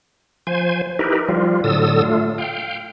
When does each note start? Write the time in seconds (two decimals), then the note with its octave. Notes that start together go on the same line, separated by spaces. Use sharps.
0.47 F3 C5 G#5
0.99 D#4 E4 G4 A#4 B4
1.29 F3 G3 F4
1.64 A2 D3 F#3 A4 D#6 E6
2.03 A3 F4
2.38 F5 G5